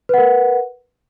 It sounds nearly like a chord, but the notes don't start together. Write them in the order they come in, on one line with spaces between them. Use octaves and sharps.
B4 F#5 A#4